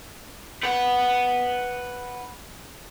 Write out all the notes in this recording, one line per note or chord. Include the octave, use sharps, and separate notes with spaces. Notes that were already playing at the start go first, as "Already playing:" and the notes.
B4 F#5